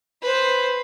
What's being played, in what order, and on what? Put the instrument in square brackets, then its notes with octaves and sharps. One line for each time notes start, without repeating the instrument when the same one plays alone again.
[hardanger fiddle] B4 C5